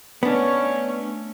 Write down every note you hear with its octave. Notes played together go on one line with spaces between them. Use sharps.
A3 B3 C#4 D4 C#5